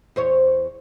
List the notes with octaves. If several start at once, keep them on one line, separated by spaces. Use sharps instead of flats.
E2 C5 C#5